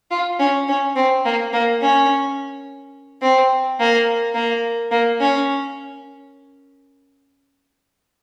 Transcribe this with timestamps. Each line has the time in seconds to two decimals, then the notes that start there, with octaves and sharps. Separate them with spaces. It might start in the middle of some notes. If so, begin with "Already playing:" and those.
0.11 F4
0.39 C#4
0.68 C#4
0.96 C4
1.25 A#3
1.53 A#3
1.81 C#4
3.22 C4
3.79 A#3
4.35 A#3
4.91 A#3
5.20 C#4